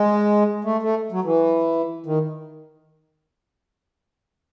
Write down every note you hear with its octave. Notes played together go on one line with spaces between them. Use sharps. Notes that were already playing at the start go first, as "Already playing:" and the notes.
Already playing: G#3
A3
A3
F#3
E3
D#3